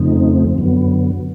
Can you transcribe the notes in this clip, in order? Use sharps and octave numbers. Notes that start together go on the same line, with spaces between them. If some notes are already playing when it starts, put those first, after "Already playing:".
Already playing: F2 C#3 F3 A3 C4 D#4
F#2 D3 F#3 B3